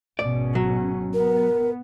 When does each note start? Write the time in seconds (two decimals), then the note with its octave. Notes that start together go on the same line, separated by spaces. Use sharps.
0.19 G#1 B2 C#4 D5
0.55 F#3
1.14 B3 A#4